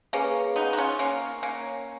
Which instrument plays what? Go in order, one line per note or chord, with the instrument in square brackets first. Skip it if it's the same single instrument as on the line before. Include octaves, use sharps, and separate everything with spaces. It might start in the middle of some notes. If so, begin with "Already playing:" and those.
[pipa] A#3 C#4 [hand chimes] G#4 B4 F5
[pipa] B3 D#4
F#4
C#4 F4
A#3 C#4
A#3 C#4